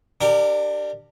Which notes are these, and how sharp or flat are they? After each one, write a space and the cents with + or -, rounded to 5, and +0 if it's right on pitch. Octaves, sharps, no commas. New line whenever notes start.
D4 +20 G4 +0 A#4 -20